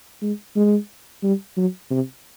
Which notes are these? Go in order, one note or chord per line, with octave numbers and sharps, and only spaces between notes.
G#3
G#3
G3
F#3
C3